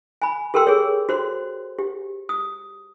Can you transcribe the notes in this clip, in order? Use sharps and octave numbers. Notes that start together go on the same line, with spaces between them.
G#5 B5
G4 A4 A#4 G5 C6 E6
G#4 C#5
F#4 C5 C6
G4
D#6